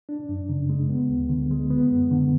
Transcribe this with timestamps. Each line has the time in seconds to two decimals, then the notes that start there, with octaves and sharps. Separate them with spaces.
0.09 D4
0.29 F#2
0.49 C#3
0.70 G#3
0.89 B3
1.09 D2
1.29 D3
1.51 G#3
1.70 B3
1.90 F#2
2.11 D3